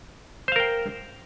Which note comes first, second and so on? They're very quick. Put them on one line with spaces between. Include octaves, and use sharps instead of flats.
C5 F5 A#4 G5